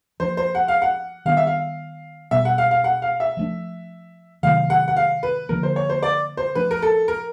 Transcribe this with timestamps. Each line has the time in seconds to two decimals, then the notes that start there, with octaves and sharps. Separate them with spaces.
0.20 F3 A#3 D4 C5
0.37 C5
0.55 F#5
0.68 F5
0.82 F#5
1.25 D#3 G3 B3 D4 F5
1.37 E5
1.47 F5
2.31 B2 G3 B3 E5
2.45 F#5
2.58 F5
2.71 F5
2.84 F#5
3.02 F5
3.20 E5
3.37 F3 A3 D4
4.43 C3 D#3 F#3 A3 F5
4.70 F#5
4.88 F#5
4.96 F5
5.23 B4
5.49 D3 F3 A#3 A#4
5.63 C5
5.76 C#5
5.90 C5
6.03 D5
6.37 C5
6.55 F3 A3 D4 B4
6.71 A#4
6.82 A4
7.08 A#4